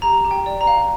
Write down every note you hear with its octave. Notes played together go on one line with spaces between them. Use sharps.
G4 A#5
G4
G5
D5
A#5
F5